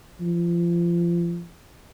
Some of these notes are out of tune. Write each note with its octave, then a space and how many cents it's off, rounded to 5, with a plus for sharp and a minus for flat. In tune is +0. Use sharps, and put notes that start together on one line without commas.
F3 -25